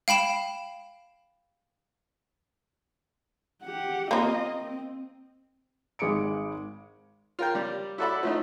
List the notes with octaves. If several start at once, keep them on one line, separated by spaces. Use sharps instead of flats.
F5 G5 B5 E7
G4 F#5
A#3 C4 F4 D#5
C4
G#1 G#3 D6 C#7 D7
F4 A#4 G5
G3 D5
E4 F#4 A4 D5 E5 B5
F3 A3 D#4